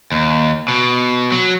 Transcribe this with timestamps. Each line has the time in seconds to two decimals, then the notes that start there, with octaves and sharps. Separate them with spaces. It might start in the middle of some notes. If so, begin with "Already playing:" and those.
0.12 D#2
0.68 B2
1.32 F#3